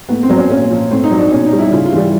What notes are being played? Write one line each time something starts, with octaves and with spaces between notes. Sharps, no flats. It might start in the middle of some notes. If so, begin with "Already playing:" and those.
A2 B3
C4
F#3
C#4
A#2 C#4
F3
A2 C4
D#4
F#3
D4
B2 C#4
D#4
G3
E4
C#3 F4
F4
E3 G3